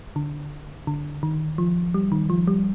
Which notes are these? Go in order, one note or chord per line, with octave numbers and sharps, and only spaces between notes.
D3
D3
D#3
F3
G3
D#3
F3
G3